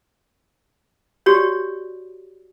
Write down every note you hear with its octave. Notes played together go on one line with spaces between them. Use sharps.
F#4 G4 C#5 D5